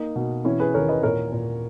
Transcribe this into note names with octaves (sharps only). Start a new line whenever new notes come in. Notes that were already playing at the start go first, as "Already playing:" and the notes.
Already playing: A#3 D#4
B2
E3 C#4 E4
G#4 B4
D#2 A#4 C#5
B4 D#5
A#2 A#4 C#5
A#2